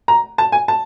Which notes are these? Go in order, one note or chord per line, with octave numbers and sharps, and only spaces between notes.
A#5
A5
G#5
A5